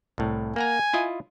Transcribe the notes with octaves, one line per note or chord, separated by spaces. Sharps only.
C2 A2
A#3 F#5 G#5 A#5
E4 F4 D#5